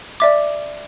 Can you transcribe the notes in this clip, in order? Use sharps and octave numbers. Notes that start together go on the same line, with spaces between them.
D5 E5 D6